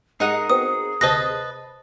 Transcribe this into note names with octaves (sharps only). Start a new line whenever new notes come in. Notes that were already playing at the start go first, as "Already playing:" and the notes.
G#2 D#4 G#4 A#4 F#5 D#6
B3 C4 F#4 D#6
D2 C3 B4 C5 D#5 A5 A#6 D#7